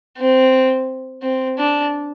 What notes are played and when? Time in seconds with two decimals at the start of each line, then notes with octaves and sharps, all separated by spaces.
0.18 C4
1.23 C4
1.58 D4